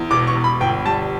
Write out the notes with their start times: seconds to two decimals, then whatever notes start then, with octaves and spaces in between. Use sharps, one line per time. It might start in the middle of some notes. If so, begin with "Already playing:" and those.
Already playing: E2
0.11 E1 D6
0.27 C#6
0.36 E1
0.44 B5
0.61 G1 G5
0.85 G3 A5